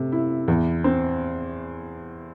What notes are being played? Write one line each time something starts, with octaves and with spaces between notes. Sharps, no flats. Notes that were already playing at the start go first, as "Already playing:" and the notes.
Already playing: C3 A3
E4
E2
C4